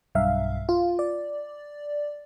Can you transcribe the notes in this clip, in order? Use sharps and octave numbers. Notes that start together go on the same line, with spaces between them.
B1 G2 E5 F5
F4
D5